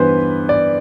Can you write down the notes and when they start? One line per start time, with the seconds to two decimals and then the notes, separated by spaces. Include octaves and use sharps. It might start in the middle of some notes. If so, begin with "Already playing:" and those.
Already playing: G2 E3 B3 B4 C5
0.49 D5